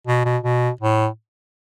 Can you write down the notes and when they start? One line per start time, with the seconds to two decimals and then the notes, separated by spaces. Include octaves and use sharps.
0.07 B2
0.25 B2
0.43 B2
0.81 A2